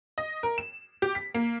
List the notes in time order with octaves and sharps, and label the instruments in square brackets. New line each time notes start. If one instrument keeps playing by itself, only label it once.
[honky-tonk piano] D#5
A#4
E7
G4
B6
A#3